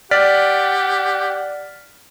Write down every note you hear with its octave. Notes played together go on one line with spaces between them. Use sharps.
G4 D5 F#5 F6 A6 B6